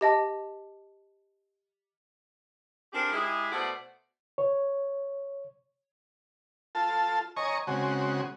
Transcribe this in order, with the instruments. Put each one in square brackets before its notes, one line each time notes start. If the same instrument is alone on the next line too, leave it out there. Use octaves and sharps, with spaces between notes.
[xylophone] G4 D#5 A5
[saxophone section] C4 D4 F4 G4 G#4 A#4
G#3 E4 G4 G#4
B2 A3 C5 D5 F#5
[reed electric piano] C#5
[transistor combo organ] F4 A4 A5
C#5 D#5 G#5 A#5 C#6
C#3 G#3 C4 F#4